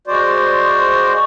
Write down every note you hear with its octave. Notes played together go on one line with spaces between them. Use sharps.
G#3 F#4 C5 D5